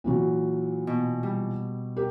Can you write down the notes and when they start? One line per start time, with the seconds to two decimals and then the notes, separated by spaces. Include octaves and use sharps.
0.04 A#2 E3 F#3
0.87 B2
1.23 G3
1.96 G4 A#4